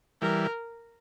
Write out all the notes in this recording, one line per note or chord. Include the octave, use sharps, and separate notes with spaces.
E3 G3 A#4